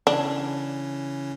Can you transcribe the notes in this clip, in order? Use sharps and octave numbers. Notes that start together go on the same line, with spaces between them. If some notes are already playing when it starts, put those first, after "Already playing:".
C#3 E3 C#4 D4